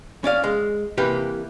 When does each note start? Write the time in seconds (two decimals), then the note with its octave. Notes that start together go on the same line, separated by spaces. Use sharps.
0.24 C#4 D5 F5
0.44 G#3
0.98 C3 E3 A#3 G4 B4